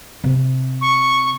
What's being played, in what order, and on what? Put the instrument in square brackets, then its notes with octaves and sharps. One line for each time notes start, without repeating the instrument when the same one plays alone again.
[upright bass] C3
[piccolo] C#6